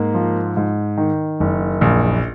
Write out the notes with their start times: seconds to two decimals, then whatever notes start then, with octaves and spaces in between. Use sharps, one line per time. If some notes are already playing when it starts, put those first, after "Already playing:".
Already playing: G#2 A#3
0.14 F3
0.57 G#2
0.97 D#3
1.40 F#1
1.81 A#1